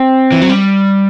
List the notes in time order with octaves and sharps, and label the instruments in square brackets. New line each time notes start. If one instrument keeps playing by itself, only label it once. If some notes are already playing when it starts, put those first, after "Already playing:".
Already playing: [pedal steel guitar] C4
[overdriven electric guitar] E3
F#3
G3